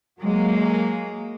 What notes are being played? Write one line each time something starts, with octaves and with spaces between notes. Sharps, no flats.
F#3 G#3 A#3